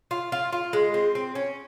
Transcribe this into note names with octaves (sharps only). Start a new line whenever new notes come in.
F4
F4
F4
G#3
C4
C4
C#4